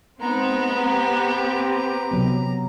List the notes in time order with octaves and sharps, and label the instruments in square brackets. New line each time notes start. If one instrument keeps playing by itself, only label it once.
[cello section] G#3 C4 D#4 [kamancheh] B3 [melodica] A#5
[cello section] C4 G4 B4
[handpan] C3 F#3 B3